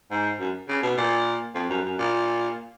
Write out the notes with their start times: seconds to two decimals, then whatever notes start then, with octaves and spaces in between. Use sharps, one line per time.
0.11 G#2
0.40 F#2
0.69 C#3
0.83 B2
0.97 A#2
1.55 F2
1.70 F#2
1.85 F#2
1.98 A#2